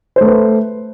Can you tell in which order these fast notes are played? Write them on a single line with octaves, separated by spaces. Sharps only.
C5 A3 B4